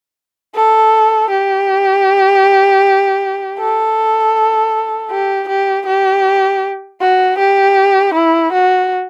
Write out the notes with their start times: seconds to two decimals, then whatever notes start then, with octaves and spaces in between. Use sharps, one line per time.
0.55 A4
1.31 G4
3.59 A4
5.11 G4
5.49 G4
5.87 G4
7.01 F#4
7.39 G4
8.14 E4
8.53 F#4